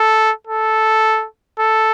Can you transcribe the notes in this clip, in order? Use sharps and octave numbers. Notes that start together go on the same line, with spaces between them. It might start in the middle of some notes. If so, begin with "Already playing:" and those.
Already playing: A4
A4
A4